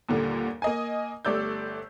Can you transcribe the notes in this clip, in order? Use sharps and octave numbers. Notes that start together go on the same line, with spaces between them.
D#2 A#2 D3 G3
A#3 D#5 G#5
G1 A3 G4 D5 E6 G6